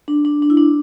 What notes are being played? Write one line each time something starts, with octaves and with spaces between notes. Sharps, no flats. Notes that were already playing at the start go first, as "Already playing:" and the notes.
D4
D4
D4
E4
D4